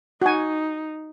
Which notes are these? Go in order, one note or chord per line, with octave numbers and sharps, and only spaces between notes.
D#4 F#4 G#5